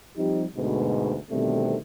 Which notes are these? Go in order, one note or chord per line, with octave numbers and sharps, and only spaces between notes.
F3 G3 C4 D#4 G4
D2 G#2 B2
B2 D3 D#3 G3 A3 C4